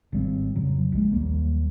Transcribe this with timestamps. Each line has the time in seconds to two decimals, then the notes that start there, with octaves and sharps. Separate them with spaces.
0.12 G#1 G3 C4
0.55 F2 C#3 F#3
0.92 A#1 G#3
1.12 D#2 F#3 G3 A#3